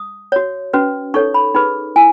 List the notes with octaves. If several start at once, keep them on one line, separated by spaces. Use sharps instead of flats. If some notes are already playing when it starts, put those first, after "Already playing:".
Already playing: D#6
F#4 C#5
C#4 F#4 B4
D#4 A4 C#5 C#6
B5
D#4 G#4 B4 B5
E4 G#5